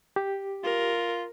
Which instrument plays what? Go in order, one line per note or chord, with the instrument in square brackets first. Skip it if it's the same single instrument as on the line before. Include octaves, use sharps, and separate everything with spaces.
[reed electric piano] G4
[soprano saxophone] F4 [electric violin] A#4